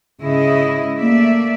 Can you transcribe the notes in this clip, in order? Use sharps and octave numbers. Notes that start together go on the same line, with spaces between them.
G#2 C#3 E4 D#5
A3 A#3 D5 E5